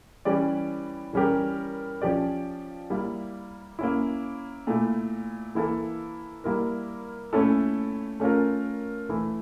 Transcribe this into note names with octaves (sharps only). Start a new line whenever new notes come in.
E3 G3 C#4 G4 D5
E3 G3 C#4 G4 A#4
F3 C#4 G4 D5
G3 A#3 E4
A#3 C#4 E4
A#2 A3 E4
E3 A#3 E4 A4
G3 A#3 E4 A#4
A#2 A3 C#4 E4 A4
A3 C#4 F4 A#4
E3 A3 E4